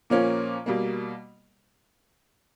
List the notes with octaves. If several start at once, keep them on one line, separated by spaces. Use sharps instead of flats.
A#2 F3 A#3 C#4
B2 G3 A#3